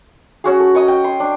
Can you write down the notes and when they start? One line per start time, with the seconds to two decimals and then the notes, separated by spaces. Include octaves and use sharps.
0.44 C#4 F#4 G#4
0.59 A4
0.75 C#5 D#5 D#6
0.88 G5
1.04 C6
1.20 D4